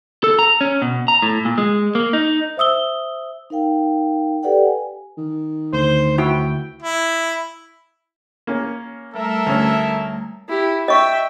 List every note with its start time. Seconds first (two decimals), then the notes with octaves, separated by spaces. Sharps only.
0.24 A4
0.39 A#5
0.61 C#4
0.82 B2
1.08 A#5
1.22 A2
1.45 A#2
1.58 G#3
1.95 A#3
2.13 D#4
2.57 C5 E5 D#6 E6 G7
3.50 D#4 A#4 F5 G5
4.43 G4 A4 B4 D5 F#5 G5
4.66 G#5
5.17 D#3
5.73 D2 C5
6.18 E4 F#4 G5
6.82 E4
8.47 A#3 C#4
9.14 G3 A3 A4 A#4 E5 A#5
9.46 D2 C#4
10.49 E4 G4
10.88 D#5 E5 G5 C#6